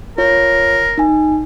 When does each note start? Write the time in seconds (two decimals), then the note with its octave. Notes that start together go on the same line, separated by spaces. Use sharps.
0.18 F4 A#4 C#5
0.98 D#4 G#5